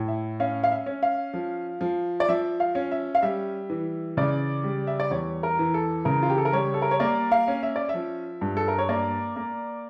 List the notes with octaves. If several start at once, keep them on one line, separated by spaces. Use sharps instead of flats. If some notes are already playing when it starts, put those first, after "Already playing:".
Already playing: A2
E5
C#4 F5
F5
E5
C#4
F5
F3
F3
D5
F3 E5
F5
C#4
E5
F5
G3 E5
E3
C#3 D5
G3
E5
D5
E2 C#5
A#4
E3
A4
C#3 A#4
F4
G4
A4
A#4
G3 C#5
A4
A#4
C#5
A#3 D5
F5
C#4
E5
D5
E5
F3
G2
A4
A#4
C#5
A#3 D5
A#3